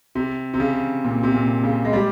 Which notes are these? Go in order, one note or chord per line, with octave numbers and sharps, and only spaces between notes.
C3
C3
C#3
A#2
C3
A#2
C#3
G#3
G3